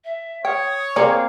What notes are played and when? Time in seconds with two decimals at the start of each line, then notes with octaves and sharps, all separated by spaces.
0.04 E5
0.45 C#5 G5 D#6
0.96 A#3 C4 G#4 D5 F5